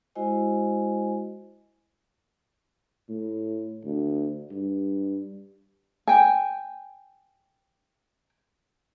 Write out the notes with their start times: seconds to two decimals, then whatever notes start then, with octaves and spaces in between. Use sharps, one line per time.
0.15 G#3 E4 F#4 C5 D#5 G#5
3.09 A2
3.85 D2
4.51 G2
6.08 G5 G#5